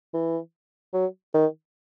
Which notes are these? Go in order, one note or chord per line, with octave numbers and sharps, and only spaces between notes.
E3
F#3
D#3